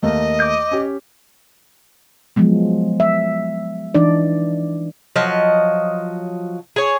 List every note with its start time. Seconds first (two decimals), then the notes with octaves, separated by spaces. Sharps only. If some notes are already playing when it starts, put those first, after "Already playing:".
0.03 D#2 A3 A#3 D#5
0.40 D6 G6
0.71 C#4 G4
2.36 F3 F#3 G#3 B3
3.00 E5
3.95 E3 D4 D#4 D5
5.16 F3 F#3 D#5
6.76 G#4 C#5